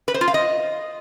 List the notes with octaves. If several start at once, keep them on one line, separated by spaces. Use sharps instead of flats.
B4
C5
F4
F5
D#5